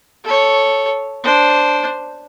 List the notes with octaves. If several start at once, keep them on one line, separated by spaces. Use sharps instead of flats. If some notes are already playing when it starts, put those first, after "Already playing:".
A4 C#5
D4 C5